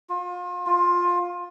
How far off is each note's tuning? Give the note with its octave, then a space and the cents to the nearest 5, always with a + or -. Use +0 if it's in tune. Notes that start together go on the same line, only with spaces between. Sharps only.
F4 +35
F4 +15